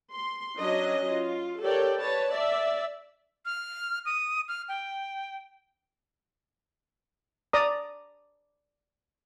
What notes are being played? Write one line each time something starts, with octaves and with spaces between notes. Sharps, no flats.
C6
F#3 C#4 D4 D#5
F4
G4 A4 A#4 C#5 D5 G5
B4 C#5 A5
D5 E5
F6
D#6
F6
G5
D5 A#5 D#6